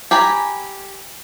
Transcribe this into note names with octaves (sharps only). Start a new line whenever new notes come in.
G4 G#5 A#5 B5